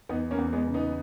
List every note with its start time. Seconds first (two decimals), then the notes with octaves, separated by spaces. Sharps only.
0.09 E2 B3 D#4
0.31 A#3 C#4
0.38 E2
0.53 G#3 B3
0.67 C#3
0.74 B3 D#4